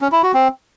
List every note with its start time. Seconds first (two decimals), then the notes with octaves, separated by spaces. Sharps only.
0.01 C#4
0.12 E4
0.23 F#4
0.34 C4